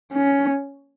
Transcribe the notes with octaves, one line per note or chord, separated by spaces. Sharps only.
C#4